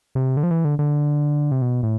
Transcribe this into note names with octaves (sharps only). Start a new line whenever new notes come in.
C3
D3
F3
E3
D3
D3
C3
B2
A2